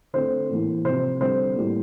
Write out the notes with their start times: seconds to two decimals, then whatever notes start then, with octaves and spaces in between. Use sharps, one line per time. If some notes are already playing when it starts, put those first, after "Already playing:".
0.13 D3 A3 C4 C5
0.49 A2 E3 A#3
0.85 C3 F3 C4 C5
1.21 D3 G3 C4 C5
1.56 A2 G3 A#3